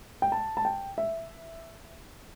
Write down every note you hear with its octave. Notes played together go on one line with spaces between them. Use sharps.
G5
A5
A5
G5
E5